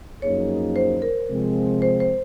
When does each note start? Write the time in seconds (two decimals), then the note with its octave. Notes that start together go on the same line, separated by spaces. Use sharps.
0.22 F#2 F3 A#3 D#4 G#4 C#5
0.76 C5
1.02 A#4
1.29 C3 F3 G#3 C4
1.82 C5
2.00 C5